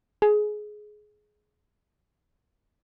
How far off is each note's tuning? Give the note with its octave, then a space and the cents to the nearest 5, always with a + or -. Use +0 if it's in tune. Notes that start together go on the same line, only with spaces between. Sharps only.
G#4 +20